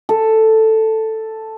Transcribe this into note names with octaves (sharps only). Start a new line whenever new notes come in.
A4